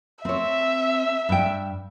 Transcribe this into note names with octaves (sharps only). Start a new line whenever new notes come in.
C4 C#5 E5
G2 G5